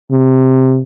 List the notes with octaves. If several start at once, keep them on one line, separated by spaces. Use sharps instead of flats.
C3